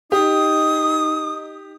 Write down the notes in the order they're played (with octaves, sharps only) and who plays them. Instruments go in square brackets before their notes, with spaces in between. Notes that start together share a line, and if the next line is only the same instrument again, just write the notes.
[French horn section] D#4 [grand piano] G4 [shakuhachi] D#6